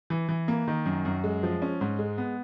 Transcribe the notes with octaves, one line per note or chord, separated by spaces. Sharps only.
E3
E3
A#3
D#3
F#2
F#2
G#3
F3
C#4
G#2
G#3
B3